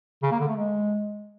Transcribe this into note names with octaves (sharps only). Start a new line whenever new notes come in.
C#3
A#3
D3
A3
G#3